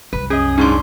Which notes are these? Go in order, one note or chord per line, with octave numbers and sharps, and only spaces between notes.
C2 F#2 B4
C#4 G#4 D#5
G#2 C#4 D4 D5 C6